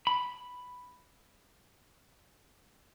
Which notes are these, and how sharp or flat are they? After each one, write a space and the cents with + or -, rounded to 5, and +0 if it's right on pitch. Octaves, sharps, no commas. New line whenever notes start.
B5 +0